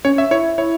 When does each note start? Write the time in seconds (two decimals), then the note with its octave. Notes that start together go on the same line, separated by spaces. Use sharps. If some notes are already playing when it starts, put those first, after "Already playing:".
0.05 C#4 C#5
0.18 E5
0.31 E4 C#5
0.58 E4 C#5